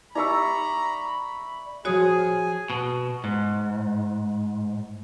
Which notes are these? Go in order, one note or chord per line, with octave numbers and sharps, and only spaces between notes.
D#4 G4 D5 E5 A#5 B5 C#6 E6
F3 F#4 G#4 C#5 G#5 D#6
B2
G#2